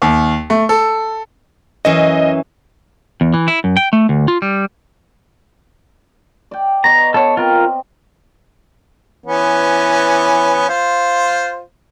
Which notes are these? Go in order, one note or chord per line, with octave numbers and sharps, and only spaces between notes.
D#2
A3
A4
F#2 E3 C#4 D#5
E2
E3
E4
F#2
G5
A3
D2
F4
G3
D5 G5
B3 C#5 D#5 A#5
B3 A4 C#5
C4 F4 A#4
E3 B3 C#4
F4 C5